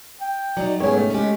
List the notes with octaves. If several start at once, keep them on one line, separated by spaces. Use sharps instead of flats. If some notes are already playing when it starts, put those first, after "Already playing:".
G5
F#3 D#4 D5
G#2 B3 C#4 G#4 C#5 G5
C#3 A3
G#3 C#4 G4